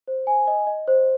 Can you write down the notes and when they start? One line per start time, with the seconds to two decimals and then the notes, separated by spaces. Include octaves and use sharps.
0.08 C5
0.27 G#5
0.47 D#5
0.67 D#5
0.88 C5